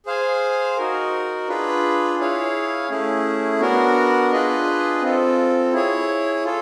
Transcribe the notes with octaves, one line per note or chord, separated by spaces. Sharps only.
G#4 C5 F5 G#5
D#4 F#4 A#4
D4 F4 G#4 B4
E4 G#4 C#5 F5
A3 C#4 E4 G#4
B3 D4 F#4 A#4
D4 F4 G#4 B4 D#5
C4 F4 A4
E4 G#4 C#5
F4 A4